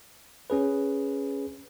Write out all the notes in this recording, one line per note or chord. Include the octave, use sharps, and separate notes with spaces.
C#4 G#4 B4